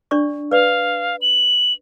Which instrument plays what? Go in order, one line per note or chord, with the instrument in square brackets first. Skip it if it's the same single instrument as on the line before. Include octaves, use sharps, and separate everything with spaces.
[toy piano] D4 D5 C#6
[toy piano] B4 D5 [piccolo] F5
[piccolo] F#7